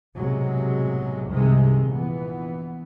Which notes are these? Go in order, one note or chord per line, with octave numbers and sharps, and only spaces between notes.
B1 A2 C3 F#3 G#3
C2 G2 C3 D#3 G#3 C4
A#1 E3 B3